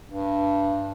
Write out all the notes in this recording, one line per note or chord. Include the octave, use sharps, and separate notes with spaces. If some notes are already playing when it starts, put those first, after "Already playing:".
G2